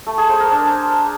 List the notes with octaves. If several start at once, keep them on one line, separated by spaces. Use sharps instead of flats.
A3
G#4
C5
A#4
D4